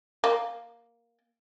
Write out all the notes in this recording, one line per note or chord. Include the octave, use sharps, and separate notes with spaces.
A#3